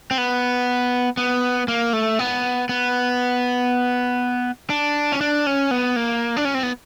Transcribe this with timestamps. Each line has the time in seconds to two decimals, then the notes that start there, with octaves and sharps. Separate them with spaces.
0.11 C4
0.18 B3
1.17 B3
1.68 A#3
1.93 A3
2.19 B3
2.69 B3
4.70 D4
5.12 C#4
5.21 D4
5.47 C#4
5.71 B3
5.96 A#3
6.37 D4
6.45 C#4
6.54 C4
6.63 B3